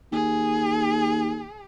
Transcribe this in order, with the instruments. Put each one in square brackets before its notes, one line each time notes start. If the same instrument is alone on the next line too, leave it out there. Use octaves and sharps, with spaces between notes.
[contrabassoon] D#2 [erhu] G#4